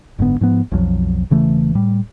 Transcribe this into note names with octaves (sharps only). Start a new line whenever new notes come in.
F#1 G#2 D3 B3
G#2 F3 B3
B1 F2 F3 F#3
E1 C#3 E3 A3
A2 G3